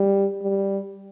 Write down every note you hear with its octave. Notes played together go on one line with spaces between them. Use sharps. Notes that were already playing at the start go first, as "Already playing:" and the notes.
Already playing: G3
G3